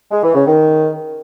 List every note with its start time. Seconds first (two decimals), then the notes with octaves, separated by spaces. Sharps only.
0.12 G#3
0.23 E3
0.35 C#3
0.47 D#3